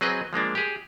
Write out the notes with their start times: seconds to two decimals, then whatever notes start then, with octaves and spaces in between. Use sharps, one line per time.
0.01 F#3 C4 G#4 B4 D#5
0.33 F3 G#3 A#3 D4
0.55 G4 G#4